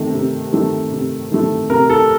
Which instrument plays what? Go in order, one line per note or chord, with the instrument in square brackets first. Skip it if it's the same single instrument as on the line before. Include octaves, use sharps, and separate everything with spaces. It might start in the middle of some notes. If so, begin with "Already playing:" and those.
Already playing: [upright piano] C3 D#3 A3
C3
D#3 A3
C3
D#3 A3
C3 A#4
A4